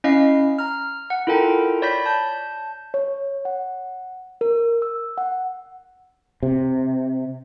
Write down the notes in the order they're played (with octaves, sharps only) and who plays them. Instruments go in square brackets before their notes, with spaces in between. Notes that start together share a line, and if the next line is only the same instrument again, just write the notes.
[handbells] C#4 E4 D#5 F5 C7
A#5 F6
F#5
E4 F4 A4 A#4 G5 A#5
C#5 D5 B5 G6 A#6 B6
A5 G6
[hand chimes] C#5
F#5
A#4
E6
F#5
[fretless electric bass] C3